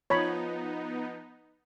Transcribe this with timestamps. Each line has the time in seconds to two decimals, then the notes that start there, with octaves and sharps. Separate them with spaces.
0.10 F3 B3 D#4 C#5 B5